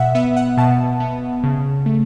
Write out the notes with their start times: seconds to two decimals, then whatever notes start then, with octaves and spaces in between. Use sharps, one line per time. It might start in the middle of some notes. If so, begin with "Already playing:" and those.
Already playing: B2 E5 F#5
0.15 B3 E5
0.36 F#5
0.57 B2 A5
1.00 B3
1.44 C#3
1.86 A3